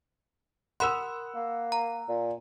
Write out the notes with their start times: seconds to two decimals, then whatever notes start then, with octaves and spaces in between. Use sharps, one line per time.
0.80 A#4 F#5 B5 C6 E6
1.35 A#3
1.72 A#5
2.08 A#2